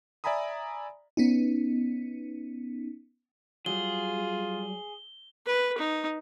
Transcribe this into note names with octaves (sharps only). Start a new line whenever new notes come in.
D5 E5 G#5 A#5 B5 D#6
B3 C#4 D#4
F#3 G3 F4 G#4 G7
B4
D#4